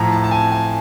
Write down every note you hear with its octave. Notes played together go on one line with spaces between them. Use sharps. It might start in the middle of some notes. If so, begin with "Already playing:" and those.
Already playing: A2 F3 A3 A#5
A5
A5
G#5
G#5